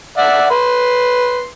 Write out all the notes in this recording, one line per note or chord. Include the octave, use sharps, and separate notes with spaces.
D5 E5 F#5
B4 C6